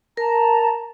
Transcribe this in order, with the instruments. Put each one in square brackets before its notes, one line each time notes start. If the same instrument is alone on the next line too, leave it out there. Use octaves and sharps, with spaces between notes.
[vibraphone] A#4 [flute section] A5 A#5